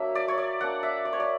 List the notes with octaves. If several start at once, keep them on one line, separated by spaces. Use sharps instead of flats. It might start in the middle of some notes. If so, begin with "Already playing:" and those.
Already playing: F#3 A#3 D4 E5
D5
C#5
D5
A#3 D4 F#5
E5
D5
C#5
D5